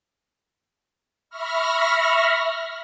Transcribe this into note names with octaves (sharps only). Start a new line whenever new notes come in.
E5 B5 C#6 F6 A#6